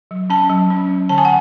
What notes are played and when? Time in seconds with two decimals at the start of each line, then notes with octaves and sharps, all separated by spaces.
0.11 F#3
0.30 C#4 A5
0.50 F#3
0.70 C#4
0.89 F#3
1.09 D3 A5
1.18 G#5
1.25 F#5